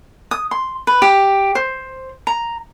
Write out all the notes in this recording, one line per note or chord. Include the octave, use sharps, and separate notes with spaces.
D#6
C6
B4
G4
C5
A#5